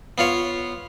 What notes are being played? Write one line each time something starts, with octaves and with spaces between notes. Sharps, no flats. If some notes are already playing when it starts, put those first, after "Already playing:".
B3 F4 C#5